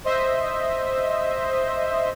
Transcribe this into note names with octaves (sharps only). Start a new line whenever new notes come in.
C5 D#5 E5